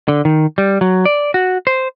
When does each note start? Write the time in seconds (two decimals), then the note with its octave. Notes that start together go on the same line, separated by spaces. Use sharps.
0.08 D3
0.25 D#3
0.58 G3
0.81 F#3
1.05 D5
1.34 F#4
1.67 C5